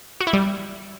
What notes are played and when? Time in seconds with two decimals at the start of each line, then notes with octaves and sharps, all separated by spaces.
0.21 F#4
0.27 E4
0.33 G3